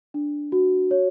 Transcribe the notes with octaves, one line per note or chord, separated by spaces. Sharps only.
D4
F#4
C#5